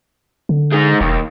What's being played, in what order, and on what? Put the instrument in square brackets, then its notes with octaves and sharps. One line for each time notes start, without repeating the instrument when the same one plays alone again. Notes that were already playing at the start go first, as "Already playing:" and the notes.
[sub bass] D3
[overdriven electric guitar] G#3 D#4
[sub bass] E1 [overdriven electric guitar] D#2